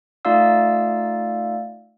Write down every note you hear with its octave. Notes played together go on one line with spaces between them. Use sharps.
A3 D#4 F4 D5 F5 E6